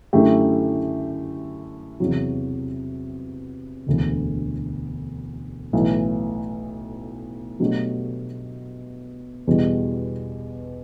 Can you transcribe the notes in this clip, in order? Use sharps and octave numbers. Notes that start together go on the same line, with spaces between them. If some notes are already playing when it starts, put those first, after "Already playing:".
F#2 D3 A3 E4 G4
E2 C3 F#3
E1 D2 D3
B1 A2 E3
B2 F#3 A3 D4 G4
E2 B2 G3